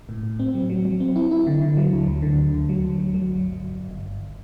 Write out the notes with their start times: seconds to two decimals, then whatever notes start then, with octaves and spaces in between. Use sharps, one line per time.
0.09 A2
0.23 A2
0.39 C4
0.55 F#3
0.70 F#3
0.85 F#3
1.00 C4
1.16 E4
1.31 E4
1.47 D3
1.61 D3
1.77 F#3
1.93 D2
2.07 D2
2.22 D3
2.38 D2
2.54 D2
2.69 F#3
2.84 D2
2.99 F#3
3.14 F#3
3.30 G1
3.46 G1
3.61 G1
3.76 G1
3.91 G1
4.06 G1